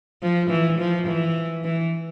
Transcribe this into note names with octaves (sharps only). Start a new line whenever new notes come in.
F3
E3
F3
E3
E3